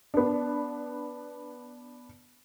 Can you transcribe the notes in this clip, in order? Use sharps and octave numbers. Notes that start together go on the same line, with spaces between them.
B3 D4